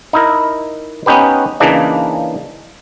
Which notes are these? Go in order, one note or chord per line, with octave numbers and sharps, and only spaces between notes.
D#4 E4 A#4
B3 C#4 D#4 G4 B4
C#3 E3 A#3 D4 D#4